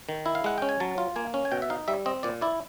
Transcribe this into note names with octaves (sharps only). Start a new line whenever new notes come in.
D#3
E4
F5
G#3 F#5
C#4 G5
G#5
F#3 A5
F4
A#3 G#5
C#4
G#5
B2 G5
E5
D#4 F5
G3 E5
C4 D#5
A#2 D5
E4 D5